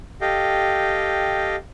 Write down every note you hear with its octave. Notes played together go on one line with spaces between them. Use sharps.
G4 A4 D#5 F5 G5